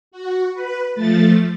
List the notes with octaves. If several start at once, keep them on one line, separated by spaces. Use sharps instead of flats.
F#4
B4
F3 A3 A6